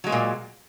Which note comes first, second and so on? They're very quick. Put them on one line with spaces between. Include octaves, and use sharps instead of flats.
F#3 G#3 A#3 A#2